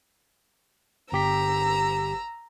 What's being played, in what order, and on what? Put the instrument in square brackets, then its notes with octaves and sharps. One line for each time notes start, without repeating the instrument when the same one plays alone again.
[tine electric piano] G1 G4 B6 [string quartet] A#5 E6